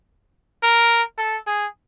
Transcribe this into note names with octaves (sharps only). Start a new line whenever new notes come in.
A#4
A4
G#4